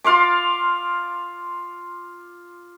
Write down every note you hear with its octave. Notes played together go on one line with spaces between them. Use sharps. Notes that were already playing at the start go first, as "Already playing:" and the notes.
F4 F5 C6 D6